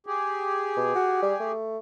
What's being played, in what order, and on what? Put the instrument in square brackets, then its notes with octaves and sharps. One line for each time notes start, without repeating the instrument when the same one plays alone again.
[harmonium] G4 G#4
[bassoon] B2
F#4
G3
A3